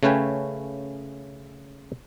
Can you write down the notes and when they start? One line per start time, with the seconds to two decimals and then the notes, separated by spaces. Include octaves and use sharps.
0.03 C#3 A3 C#4 B4 G5 G#5